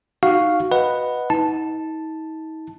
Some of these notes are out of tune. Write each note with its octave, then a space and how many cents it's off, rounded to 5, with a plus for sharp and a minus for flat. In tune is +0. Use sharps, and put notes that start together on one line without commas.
D#4 +0 F#4 +0 F5 +0
B4 +0 D#5 +0 F#5 +0
D#4 +40 A5 +0